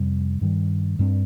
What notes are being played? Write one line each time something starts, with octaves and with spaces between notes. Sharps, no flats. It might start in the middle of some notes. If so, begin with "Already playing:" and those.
Already playing: F2 C3 G3
G2 D#3 G3
G2 G3 C4